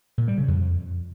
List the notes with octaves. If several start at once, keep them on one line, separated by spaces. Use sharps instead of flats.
A#2
G3
C#3
F2